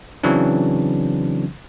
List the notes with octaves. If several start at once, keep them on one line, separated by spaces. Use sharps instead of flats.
C#3 E3 F#3 C4 D4